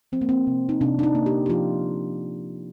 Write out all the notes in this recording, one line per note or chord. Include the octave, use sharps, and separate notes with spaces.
F3 C4
A#3
C4
C3
D#4
C3 D4
D4
D#4
A#3
G4
G4
F3 F4